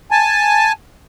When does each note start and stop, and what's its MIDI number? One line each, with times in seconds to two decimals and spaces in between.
0.11 0.72 80
0.11 0.72 81